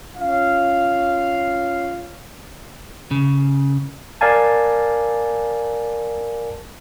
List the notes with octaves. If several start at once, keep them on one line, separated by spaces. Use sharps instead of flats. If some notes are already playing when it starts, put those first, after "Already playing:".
C#4 F4 C#5 F5
C#3
A#4 D5 F5 G#5 A5